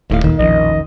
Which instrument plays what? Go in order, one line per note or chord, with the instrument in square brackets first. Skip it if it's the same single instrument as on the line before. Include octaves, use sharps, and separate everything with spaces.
[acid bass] D#1 [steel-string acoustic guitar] D#2 A2 F5
[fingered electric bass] D#2 A#2 [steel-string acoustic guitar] D#3
[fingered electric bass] E1 F3 C#4 [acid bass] A#1 [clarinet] D#5